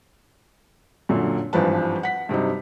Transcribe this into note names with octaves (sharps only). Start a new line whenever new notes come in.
F#2 A#2 D3
G#1 G2 E3 F3 B4 A5
F#5 B6
G2 C3 F#3 D#4